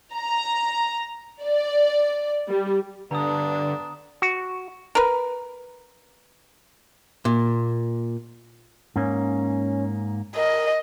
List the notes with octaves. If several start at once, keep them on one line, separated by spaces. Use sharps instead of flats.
A#5
D5
G3
G2 D3 B3 D4 A#5 D#6
F#4
A#4 B4
A#2
G#2 A#3 C#4
A#4 D#5